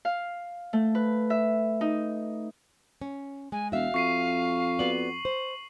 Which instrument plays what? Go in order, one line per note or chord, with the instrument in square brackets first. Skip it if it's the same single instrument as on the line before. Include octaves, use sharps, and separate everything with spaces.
[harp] F5
A3
B4
E5
D#4
[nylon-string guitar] C#4
[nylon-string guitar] G#3 [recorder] G#5
[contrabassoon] E1 [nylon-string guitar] F#4 E5 [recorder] F5
[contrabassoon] F2 [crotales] C#6 C7 D#7
[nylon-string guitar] B3 F#4 D5 [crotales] F#7
[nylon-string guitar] C5